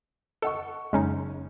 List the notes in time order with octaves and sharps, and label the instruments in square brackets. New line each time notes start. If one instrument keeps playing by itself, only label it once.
[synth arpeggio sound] A4 E6 [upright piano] D#5 F#5 C#6
[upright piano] F#1 [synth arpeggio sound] G#3 C#4 D#4